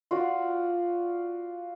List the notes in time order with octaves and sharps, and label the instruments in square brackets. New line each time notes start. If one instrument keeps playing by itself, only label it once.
[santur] F4 F#4 D5